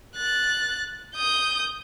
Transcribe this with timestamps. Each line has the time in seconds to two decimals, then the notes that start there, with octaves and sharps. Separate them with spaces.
0.16 F#6 A6
1.16 D#6 G6